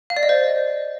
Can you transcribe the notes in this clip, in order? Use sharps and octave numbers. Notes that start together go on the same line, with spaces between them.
F5
D5
D#5
C5